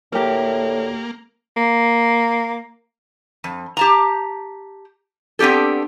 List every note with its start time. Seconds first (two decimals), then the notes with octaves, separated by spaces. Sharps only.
0.12 D2 A2 A#3 G4 A#4
1.57 A#3
3.44 F2
3.77 G4 A5 A#5
5.39 B3 C4 D4 G4 A4